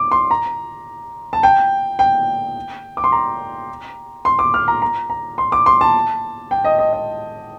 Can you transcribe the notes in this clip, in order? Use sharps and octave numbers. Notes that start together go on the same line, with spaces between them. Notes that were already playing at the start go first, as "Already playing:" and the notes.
Already playing: D6
C6
A#5
A5
G5
G5
D6
C6
A#5
C6
D6
F6
A#5
A#5
A#5
C6
D6
C6
A5
G5
D#5
D#5
D#5